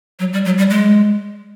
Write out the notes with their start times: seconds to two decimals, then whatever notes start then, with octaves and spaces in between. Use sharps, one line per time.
0.19 F#3
0.33 G3
0.45 F#3
0.58 G3
0.70 G#3